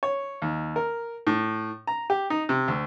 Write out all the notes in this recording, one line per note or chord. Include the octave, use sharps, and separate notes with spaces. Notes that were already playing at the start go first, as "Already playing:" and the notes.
C#5
D#2
A#4
A2
A#5
G4
D#4
C3
D2